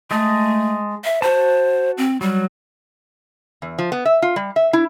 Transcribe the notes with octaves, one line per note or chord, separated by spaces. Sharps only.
G#3 A3 D#5 A5
E5
F#4 C5 A5
C4
F#3 G3
E2
F3
B3
E5
F4
G3
E5
E4